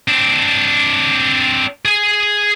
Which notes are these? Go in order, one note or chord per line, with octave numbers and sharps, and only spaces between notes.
C4 D4
G#4 G#5